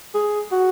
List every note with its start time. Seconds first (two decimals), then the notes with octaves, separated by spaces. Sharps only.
0.14 G#4
0.52 F#4